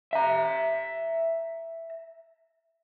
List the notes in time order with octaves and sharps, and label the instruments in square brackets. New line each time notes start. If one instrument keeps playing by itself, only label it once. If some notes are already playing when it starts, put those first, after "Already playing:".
[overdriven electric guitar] E5 A#5